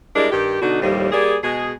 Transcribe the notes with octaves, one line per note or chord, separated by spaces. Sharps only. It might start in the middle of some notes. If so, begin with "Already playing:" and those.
G3 G#3 D4 E4 A#4
G2 D#3 G4
B2 D3 D4 D#4 F#4
D#2 A2 F3 G3
G3 A#3 G#4
B2 G#3 G#4